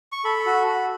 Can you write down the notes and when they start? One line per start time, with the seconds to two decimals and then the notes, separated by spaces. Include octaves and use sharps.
0.12 C#6
0.24 A4 B5
0.46 F#4
0.68 F#4